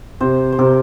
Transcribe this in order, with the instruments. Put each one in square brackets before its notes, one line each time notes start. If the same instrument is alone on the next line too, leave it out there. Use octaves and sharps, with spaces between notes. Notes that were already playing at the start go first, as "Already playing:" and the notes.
[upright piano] C3 [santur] C5
[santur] C5
[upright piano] C3 [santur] A#4